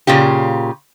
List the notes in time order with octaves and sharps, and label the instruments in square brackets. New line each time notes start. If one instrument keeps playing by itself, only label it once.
[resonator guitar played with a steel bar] A#2 C#3 F4 G4